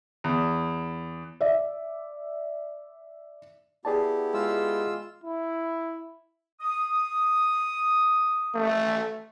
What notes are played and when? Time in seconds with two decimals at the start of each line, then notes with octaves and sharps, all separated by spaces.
0.24 E2
1.41 D5 E5
3.85 B3 E4 G4 G#4 D5 A5
4.34 G#3 F4 E6
5.24 E4
6.61 D#6
8.55 A3